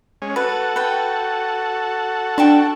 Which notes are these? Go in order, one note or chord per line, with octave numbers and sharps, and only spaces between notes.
G#3 C#4
F#4 A4 B4
B4 G5
D4 G5 A5 C#6